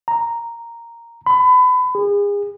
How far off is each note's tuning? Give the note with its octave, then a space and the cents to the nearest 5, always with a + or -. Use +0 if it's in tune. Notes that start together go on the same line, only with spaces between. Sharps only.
A#5 -5
B5 +30
G#4 -35